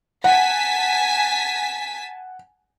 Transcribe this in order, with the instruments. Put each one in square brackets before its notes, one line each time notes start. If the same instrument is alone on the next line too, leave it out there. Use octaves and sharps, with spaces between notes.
[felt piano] F#5 [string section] G#5 A5 B6